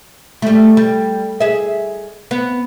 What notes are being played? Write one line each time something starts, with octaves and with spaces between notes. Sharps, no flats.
G3 A3
G3
G#4 E5
B3